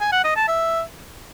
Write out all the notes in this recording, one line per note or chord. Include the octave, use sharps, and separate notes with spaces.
G#5
F#5
D#5
A5
E5